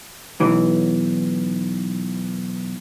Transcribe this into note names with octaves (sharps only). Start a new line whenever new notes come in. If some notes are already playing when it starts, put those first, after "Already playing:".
B1 E3